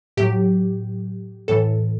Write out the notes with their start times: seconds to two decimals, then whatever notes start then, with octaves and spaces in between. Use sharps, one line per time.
0.17 A2 F#3 G4
1.48 A2 E3 A4